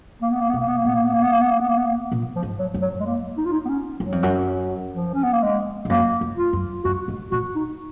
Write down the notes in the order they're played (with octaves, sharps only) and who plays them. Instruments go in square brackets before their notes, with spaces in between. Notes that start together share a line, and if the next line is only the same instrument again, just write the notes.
[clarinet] A#3
B3
A#3
[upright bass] B2 [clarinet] B3
[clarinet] A#3
B3
A#3
[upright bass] A#2 [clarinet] B3
[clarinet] A#3
B3
A#3
B3
A#3
B3
A#3
B3
A#3
B3
A#3
[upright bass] A#2
[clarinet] F3
[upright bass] G#2
[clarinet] F#3
[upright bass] F#2
[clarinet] F#3
G#3
A#3
D#4
F4
D#4
B3
C#4
[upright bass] F#2 [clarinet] F#3
[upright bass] F2
F#2
[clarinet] F3
C#4
B3
A#3
G#3
[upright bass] G#2
[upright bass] F#2 [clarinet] A#3
[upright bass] F#2
[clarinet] F4
[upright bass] F#2
[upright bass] F#2 [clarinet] F#4
[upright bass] G#2
[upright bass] A#2 [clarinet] F#4
[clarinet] D#4